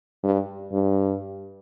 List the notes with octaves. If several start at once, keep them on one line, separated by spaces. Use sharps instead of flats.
G2
G2